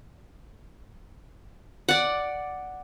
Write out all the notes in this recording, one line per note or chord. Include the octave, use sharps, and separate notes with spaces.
D5 F#5